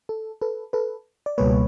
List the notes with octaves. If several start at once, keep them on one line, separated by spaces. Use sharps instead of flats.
A4
A4 B4
A4 B4
D5
C#2 B2 G3 A#3 B4 C#5